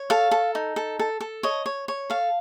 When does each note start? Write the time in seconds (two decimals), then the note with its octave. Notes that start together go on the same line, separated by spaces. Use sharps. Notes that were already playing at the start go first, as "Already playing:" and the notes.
Already playing: C#5
0.10 A4 F5
0.31 A4
0.55 D#4
0.76 A4
0.99 A4
1.21 A4
1.43 C#5 D#5
1.66 C#5
1.88 C#5
2.10 A4 F5